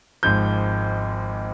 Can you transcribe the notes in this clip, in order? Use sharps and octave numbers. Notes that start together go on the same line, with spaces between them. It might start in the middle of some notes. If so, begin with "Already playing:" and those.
G#1 G#2 F3 G6